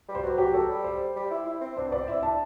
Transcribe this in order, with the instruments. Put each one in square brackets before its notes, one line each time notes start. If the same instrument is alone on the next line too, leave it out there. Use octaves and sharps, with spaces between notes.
[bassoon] G3
[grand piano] C5
[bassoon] F#3 [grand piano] B4
[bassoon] F#3 [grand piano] G4
[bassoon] F#3 [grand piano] A4
[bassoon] G3
[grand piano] C5
[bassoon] G3
E4
E4
C4
[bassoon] D4 [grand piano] C5
[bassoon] B3
[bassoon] C4 [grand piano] D5
[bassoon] E4 [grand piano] E5
[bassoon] D4 [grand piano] A5